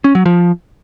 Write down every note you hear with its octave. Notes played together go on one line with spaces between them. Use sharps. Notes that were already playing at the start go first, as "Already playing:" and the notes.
C#4
F#3
F3